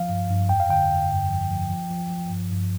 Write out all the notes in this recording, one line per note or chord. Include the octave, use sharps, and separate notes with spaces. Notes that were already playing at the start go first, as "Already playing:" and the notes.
Already playing: F3 F5
G2
G2
F2 G5
F5
D3 G5
F2
G2
F3
F3
F3
F3
F3
G2
G2